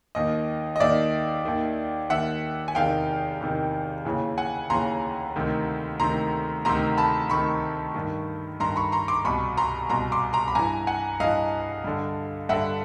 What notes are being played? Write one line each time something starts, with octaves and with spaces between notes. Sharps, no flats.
D#2 D#3 D#5
D#5
D#2 D#3 D5 E5
D#2 D#3
D#2 D#3 E5 F#5
G#5
E2 C3 D#3 F5 G5
E2 C3 D#3
D#2 C#3 E3
F#5 G#5
D#2 C#3 E3 A#5 C6
D2 C3 D#3
D2 C3 D#3 A#5 C6
D2 C3 D#3 A#5 C6
A5 B5
D2 C3 D#3 B5 C#6
G2 D#3
G2 D#3 A#5 C6
B5 C#6
A#5 C6
C6 D6
C2 B2 B5 C#6
A#5 C6
C2 B2 A#5 C6
C6 D6
A#5 C6
B5
G2 E3 G#5 A#5
F#5 G#5
G2 E3 D#5 F5
G2 D3
G2 D3 E5 F#5